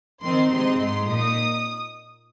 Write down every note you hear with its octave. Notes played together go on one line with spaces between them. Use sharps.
D#3 C4 D#4 C6
C3 G#3 C4 D#4 C6
G#2 G#3 D#4 C6
A#2 A#3 D#4 D#6